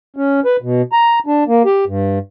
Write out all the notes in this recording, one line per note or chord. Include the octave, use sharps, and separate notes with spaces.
C#4
B4
B2
A#5
D4
A#3
G4
G2